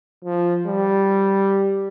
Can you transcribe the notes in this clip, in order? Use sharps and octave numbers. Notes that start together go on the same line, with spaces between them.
F3
G3